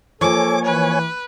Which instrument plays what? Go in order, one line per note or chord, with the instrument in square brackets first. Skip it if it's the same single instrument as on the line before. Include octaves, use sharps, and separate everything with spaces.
[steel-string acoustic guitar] F3 A#3 [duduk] A4 [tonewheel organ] C#5 G#5 [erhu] D6
[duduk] E3 [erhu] B4